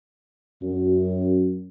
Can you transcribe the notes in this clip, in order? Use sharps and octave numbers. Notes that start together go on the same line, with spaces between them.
F#2